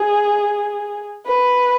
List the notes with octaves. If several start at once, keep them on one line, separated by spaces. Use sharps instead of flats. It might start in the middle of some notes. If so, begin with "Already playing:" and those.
Already playing: G#4
B4